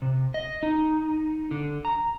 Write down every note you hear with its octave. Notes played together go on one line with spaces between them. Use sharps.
C3
D#5
D#4
D3
A#5